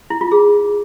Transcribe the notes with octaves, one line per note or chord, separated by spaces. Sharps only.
E4
F4
G#4